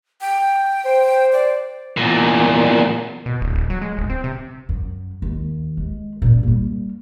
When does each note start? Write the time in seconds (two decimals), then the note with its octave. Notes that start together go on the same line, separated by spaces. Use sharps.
0.21 G5
0.85 C5
1.32 D5
1.97 E2 A#2
3.26 B2
3.41 D1
3.55 D1
3.70 F#3
3.82 G#3
3.97 D1
4.10 C4
4.24 C3
4.69 F#2
5.22 D#2
5.77 G#3
6.22 F#2 A#2
6.43 G3 A#3